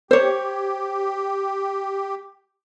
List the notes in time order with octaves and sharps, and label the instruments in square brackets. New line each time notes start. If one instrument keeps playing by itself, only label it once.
[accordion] G4 [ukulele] C5 C#5